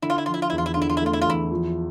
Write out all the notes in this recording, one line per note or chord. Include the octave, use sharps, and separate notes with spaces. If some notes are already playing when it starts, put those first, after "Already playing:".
D3 E4
F4
E4
F3 F4
E4
F4
E2 E4
F4
E4
F4
D3 E4
F4
E4
A3 F4
E4
F4
E2 E4
F3